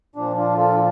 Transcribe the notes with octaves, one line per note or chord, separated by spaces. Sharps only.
A#2 F3 D4
D4 F4
F4 A4